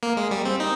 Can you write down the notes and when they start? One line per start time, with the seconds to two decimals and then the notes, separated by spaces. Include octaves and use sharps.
0.03 A#3
0.17 G#3
0.31 G3
0.45 C4
0.60 D#4